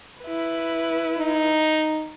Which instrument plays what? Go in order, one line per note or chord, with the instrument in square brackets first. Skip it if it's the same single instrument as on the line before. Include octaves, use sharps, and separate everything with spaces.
[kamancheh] E4 B4
[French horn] D#4